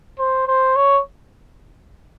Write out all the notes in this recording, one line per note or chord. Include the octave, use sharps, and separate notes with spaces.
C5
C5
C#5